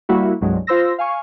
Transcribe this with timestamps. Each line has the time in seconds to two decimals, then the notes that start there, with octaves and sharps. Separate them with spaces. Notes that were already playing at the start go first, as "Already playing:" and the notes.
0.09 G3 A#3 E4 F#4
0.41 C2 G2 F#3 G#3
0.67 F4 C5 C6 E6 A#6
0.98 F5 G#5 C#6